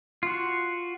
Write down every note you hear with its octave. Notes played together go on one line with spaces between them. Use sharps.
F4 F#4